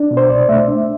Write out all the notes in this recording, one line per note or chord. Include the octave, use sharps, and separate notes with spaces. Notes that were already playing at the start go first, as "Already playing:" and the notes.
Already playing: D4
B2
C5
C2 D5
A3 E5
D4